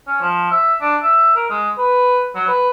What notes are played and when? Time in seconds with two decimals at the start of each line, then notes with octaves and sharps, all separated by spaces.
0.07 C#4
0.21 F3
0.51 E5
0.81 D4
1.02 E5
1.35 A#4
1.50 G#3
1.78 B4
2.35 F#3
2.48 B4